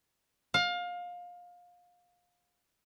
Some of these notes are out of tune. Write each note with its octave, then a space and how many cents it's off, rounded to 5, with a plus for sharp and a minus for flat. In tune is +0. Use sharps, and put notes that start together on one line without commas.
F5 +25